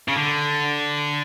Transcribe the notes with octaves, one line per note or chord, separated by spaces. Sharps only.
C#3
D3